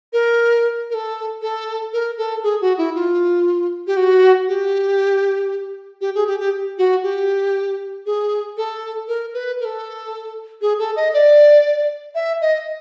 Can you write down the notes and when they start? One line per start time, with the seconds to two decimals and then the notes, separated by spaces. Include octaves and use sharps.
0.13 A#4
0.90 A#4
0.94 A4
1.42 A4
1.93 A#4
2.17 A4
2.43 G#4
2.61 F#4
2.78 E4
2.95 F4
3.87 G4
3.97 F#4
4.48 G4
6.01 G4
6.15 G#4
6.27 G4
6.40 G4
6.78 F#4
7.03 G4
8.06 G#4
8.57 A4
9.08 A#4
9.34 B4
9.60 A#4
9.65 A4
10.61 G#4
10.79 A4
10.96 D#5
11.14 D5
12.15 E5
12.41 D#5